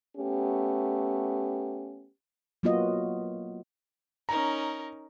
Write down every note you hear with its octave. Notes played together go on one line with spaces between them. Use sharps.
A3 B3 C#4 G4
F#3 A#3 B3 F4 F#4 D#5
C#4 D#4 A#4 A#5